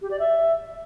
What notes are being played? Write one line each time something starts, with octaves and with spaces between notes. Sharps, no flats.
G4
D5
E5